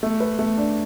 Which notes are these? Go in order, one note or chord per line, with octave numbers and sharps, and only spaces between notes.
A3
B4
A3
D4